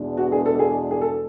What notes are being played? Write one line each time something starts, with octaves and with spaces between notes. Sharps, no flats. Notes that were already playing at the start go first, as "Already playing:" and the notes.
Already playing: E2 B2 G#3 D4
F#4
G#4
A4
G#4
G#4
A4